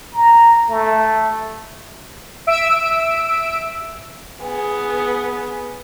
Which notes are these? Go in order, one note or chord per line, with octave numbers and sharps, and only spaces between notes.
A#5
A3
E5 E6 D7
B3 G#4